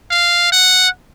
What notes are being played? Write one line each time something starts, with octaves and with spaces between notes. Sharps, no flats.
F5
F#5